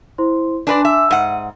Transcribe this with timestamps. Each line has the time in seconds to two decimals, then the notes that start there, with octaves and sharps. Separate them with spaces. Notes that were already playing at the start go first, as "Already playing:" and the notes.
0.18 E4 C5 C6
0.67 D4 B4 D5 G#5 C6 D6
0.85 E5
1.11 G#2 F#5 D#7